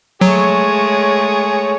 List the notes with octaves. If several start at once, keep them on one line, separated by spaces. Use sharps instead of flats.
F#3 G#3 A3 G#4 C#5